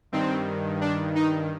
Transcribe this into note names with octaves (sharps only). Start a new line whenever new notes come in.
G2 D#3 C4
D4
D#4